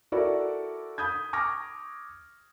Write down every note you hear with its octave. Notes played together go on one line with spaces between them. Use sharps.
E4 F#4 A4 A#4 D5
B5 D#6 G6 G#6
C#6 D6 F6 G#6 A#6